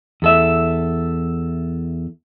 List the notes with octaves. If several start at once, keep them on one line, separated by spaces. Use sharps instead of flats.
E2 A4 E5